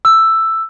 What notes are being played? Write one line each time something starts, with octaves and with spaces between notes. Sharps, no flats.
E6